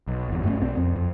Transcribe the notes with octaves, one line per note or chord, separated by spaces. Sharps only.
B1
G1 E2
G2 A3 A#3 C#4
B1 C4
F2
F2